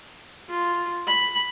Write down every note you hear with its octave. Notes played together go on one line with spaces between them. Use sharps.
F4
B5